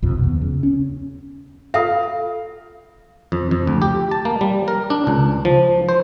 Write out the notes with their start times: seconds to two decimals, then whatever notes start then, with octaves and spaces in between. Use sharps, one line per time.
0.02 B1 F2 C3
0.19 D#2 B3
0.41 C#3
0.63 C#4
1.74 F4 A4 E5 F5
3.32 F2
3.51 F2
3.67 D2
3.82 G4
4.11 A5
4.25 A#3
4.41 G3
4.68 A#4
4.90 D4
5.07 C#2
5.45 F3
5.89 C5